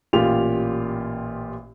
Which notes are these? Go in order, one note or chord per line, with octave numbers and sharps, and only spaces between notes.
A1 A#2 F4 G4 F7